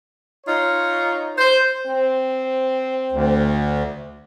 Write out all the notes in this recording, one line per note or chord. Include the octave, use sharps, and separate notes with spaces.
D#4 F4 C#5
C5
C4
D2